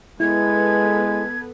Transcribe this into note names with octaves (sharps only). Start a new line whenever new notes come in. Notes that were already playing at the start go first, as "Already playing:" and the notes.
G#3 B3 E4 A4 B4 G#6